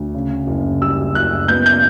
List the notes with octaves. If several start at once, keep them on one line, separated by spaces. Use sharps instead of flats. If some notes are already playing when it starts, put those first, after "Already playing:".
Already playing: D2
C#3
F#1
G3 E6
F#1 F#6
B3 G6
G6